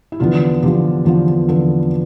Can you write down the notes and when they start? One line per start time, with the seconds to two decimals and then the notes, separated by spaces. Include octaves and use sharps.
0.12 E4
0.20 E2 D3 F3 B3 F4
0.62 E2 D3 F3 B3 G4
1.05 E2 D3 F3 B3
1.48 E2 D3 F3 B3 A4